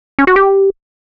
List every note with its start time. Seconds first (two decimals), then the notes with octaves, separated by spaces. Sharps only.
0.19 C#4
0.27 F#4
0.36 G4